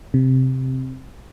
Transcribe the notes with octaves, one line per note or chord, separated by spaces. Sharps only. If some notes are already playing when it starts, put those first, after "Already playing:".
C3